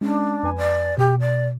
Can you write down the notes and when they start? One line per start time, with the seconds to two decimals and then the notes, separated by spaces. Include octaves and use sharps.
0.01 G#3 C#4 D4
0.43 F2 B4 G#5
0.57 D5
0.98 B2 G4
1.20 D5